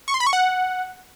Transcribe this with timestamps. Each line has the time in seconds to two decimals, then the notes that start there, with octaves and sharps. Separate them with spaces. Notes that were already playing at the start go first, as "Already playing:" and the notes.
0.08 C#6
0.14 C6
0.20 B5
0.27 C#6
0.33 F#5